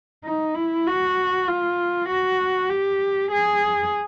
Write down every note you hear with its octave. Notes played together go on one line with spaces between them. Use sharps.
D#4
E4
F#4
F4
F#4
G4
G#4